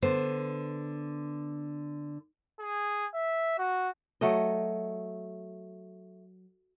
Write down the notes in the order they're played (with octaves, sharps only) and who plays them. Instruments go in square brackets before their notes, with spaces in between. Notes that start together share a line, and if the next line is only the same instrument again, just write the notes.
[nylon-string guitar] D3 B3 C5
[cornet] G#4
E5
F#4
[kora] F#3 A3 D#5